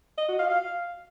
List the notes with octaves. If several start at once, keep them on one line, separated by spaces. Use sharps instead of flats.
D#5
F#4
F5
F5